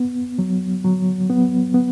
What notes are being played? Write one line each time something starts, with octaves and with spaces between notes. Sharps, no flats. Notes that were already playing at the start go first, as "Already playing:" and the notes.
Already playing: B3
F#3
F#3
B3
B3